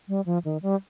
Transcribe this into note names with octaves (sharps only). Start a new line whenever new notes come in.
G3
F3
D#3
G3